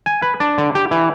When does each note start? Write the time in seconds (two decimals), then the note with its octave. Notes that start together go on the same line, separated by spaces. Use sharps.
0.06 G#5
0.22 B4
0.40 D4
0.58 D3
0.75 G4
0.91 E3